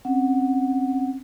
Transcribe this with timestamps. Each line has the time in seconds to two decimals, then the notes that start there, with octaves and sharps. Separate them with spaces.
0.05 C4 C#4 F#5